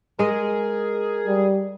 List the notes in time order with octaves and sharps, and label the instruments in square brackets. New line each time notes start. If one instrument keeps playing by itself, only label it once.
[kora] G#3 D#5 [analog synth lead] G#4 [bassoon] A#4
[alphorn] G3